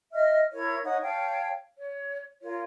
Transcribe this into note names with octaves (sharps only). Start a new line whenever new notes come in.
D#5 E5 F6
E4 A#4 C#5 G#6
D#4 C#5 F#5 D#6
C#5 F5 G5 A5
C#5
F4 A#4 C#5